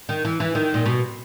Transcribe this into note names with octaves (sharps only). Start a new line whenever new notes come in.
D#3
E3
E3
D#3
A#2
B2